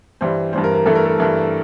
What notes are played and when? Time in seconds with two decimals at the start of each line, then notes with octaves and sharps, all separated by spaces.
0.21 G2 E3 G3 C5
0.53 G2 E3 G3 C5
0.64 A#4
0.75 A#4
0.85 G2 E3 A3 A4
0.95 A#4
1.05 A4
1.18 G2 E3 A3 A#4